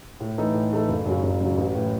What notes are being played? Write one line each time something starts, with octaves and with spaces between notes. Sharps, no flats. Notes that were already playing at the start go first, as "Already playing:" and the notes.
A2
E3 A3 D#4 A4
A2
E3 A3 D#4 A4
F#1
F#2 C#3 F#3
F#1
F#2 C#3 F#3
A1
A2 E3